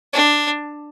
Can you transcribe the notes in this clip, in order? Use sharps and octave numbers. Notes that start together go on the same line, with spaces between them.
D4